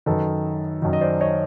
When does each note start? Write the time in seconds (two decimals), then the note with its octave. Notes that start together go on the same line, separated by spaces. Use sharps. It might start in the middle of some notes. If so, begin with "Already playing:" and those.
0.06 F#2 D#3 A4 B4
0.82 F#2 D#3
0.93 D#5
1.01 C5 D5
1.21 C#5 D#5